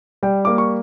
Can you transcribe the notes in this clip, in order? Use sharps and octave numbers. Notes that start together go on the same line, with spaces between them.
G3 G5
A#3 D6
C#6